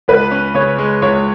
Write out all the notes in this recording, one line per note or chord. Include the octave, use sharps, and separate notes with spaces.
C#2 B4
C#4
C#3 C#5
G#3
C#2 C#5